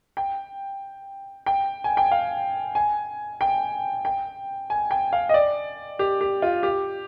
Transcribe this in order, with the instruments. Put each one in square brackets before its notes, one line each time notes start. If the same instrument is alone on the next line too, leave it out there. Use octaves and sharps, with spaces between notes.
[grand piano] G5
G5
G#5
G5
F5
G#5
G5
G5
G#5
G5
F5
D#5
D5
G4
G4
F4
G4